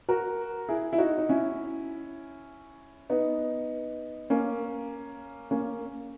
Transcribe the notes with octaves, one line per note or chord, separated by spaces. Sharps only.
F#4 A#4
E4 G#4
E4
D#4 F#4
D#4
C#4 E4
B3 D#4
A#3 C#4
A#3 C#4